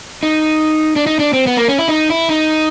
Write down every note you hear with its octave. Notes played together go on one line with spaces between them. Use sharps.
D#4
D4
D#4
D4
C4
B3
A#3
C#4
E4
D#4
E4
D#4